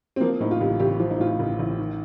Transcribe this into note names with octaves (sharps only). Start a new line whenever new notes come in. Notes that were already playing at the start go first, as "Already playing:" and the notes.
C4
F3 A#3
A2 D#4
F4
A1 G4
A1 G4
F3 F4
D#4
A2 F4
A1
A1
D#3